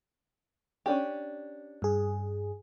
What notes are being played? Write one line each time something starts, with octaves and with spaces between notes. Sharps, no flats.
C#4 D4 G4
G2 G#4